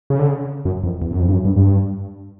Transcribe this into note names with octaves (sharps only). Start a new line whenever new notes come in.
C#3
D3
C#3
F#2
F2
E2
F#2
F2
G2
F#2
G2
G2